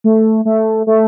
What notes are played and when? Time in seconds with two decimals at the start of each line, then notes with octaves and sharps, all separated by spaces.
0.04 A3
0.45 A3
0.87 A3